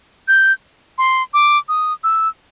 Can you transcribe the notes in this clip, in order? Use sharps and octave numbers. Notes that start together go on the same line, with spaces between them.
G6
C6
D6
D#6
E6